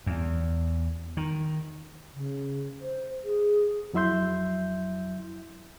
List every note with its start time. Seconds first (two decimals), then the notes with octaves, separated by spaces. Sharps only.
0.06 E2
1.17 D#3
2.14 C#3
2.81 C5
3.24 G#4
3.93 F2 F#3 E4 E5 C6 G6